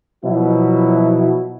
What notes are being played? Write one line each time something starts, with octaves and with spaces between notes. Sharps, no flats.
B2 F3 F#3 E4 F#4